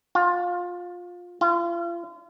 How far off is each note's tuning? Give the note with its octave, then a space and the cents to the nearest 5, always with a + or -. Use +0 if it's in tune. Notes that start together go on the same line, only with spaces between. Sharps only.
F4 +20
F4 -35